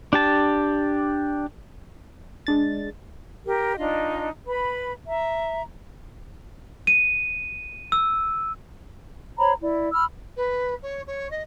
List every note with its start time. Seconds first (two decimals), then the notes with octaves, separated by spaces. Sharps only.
0.13 D4 G4 A5
2.47 G#3 D4 A6
3.46 G4 A#4
3.78 D4 D#4 F4 D#5
4.46 B4 B5
5.07 E5 A#5
6.87 D#7
7.92 E6
9.38 C5 C#5 A#5 B5
9.60 E4 D5
9.92 B5 E6 F6
10.36 B4
10.82 C#5
11.07 C#5
11.30 D#5